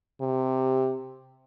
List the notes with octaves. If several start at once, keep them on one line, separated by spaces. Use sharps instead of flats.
C3